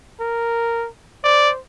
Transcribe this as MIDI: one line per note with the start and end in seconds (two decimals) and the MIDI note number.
0.20 0.88 70
1.24 1.59 72
1.24 1.51 74